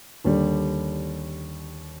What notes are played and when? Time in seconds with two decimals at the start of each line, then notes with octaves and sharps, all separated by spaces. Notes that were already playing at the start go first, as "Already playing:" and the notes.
0.25 D#2 D3 G3